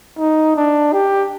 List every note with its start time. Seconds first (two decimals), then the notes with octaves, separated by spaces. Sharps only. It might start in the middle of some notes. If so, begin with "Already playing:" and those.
0.19 D#4
0.56 D4
0.93 G4